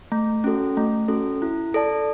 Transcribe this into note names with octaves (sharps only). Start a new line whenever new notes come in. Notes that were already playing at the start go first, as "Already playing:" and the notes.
A3
C#4 F#4 A4
A3
C#4 F#4 A4
E4
A4 D5 A5